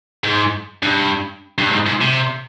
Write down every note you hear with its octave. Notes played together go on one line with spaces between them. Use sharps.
G#2
G2
G2
G#2
G#2
C3